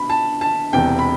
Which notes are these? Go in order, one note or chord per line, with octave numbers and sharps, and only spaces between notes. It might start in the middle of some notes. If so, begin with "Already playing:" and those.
Already playing: B2 B5
A5
A5
E1 E2 C3 G5
B5